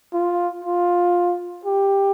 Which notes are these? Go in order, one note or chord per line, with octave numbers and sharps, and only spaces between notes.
F4
F4
G4